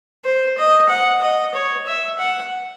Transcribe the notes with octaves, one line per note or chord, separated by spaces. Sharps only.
C5
D#5
F#5
D#5
C#5
E5
F#5